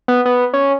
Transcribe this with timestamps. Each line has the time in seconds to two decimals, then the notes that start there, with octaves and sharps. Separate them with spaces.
0.08 B3
0.25 B3
0.53 C#4